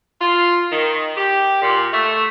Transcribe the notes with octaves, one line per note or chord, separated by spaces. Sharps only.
F4
D#3
G4
A#2
A3